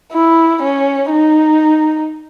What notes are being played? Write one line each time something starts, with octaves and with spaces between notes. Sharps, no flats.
E4
C#4
D#4